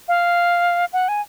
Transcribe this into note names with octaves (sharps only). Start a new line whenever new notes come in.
F5
F#5
G#5